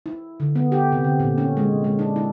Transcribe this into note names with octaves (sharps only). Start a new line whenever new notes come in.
E4
D3
B3
G4
C3
D3
A#2
C#4
G#3
G#3
D4
E4